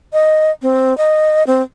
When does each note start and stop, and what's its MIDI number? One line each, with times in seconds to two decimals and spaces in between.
0.13 0.51 75
0.62 0.96 60
0.98 1.43 75
1.47 1.62 60